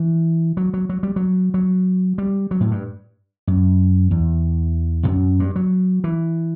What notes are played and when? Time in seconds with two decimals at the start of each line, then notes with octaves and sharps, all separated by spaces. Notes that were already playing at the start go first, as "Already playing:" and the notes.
Already playing: E3
0.57 F#3
0.74 F#3
0.89 F#3
1.03 G3
1.16 F#3
1.54 F#3
2.18 G3
2.51 F#3
2.61 A2
2.71 G2
3.47 F#2
4.11 E2
5.03 E2
5.08 F#2
5.40 G2
5.56 F#3
6.04 E3